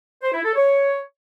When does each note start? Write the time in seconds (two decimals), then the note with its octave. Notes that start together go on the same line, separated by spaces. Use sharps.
0.23 C5
0.34 E4
0.45 A4
0.56 C#5